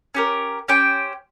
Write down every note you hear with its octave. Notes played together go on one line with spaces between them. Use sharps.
C#4 G4 A#4
C#4 G4 C5 G5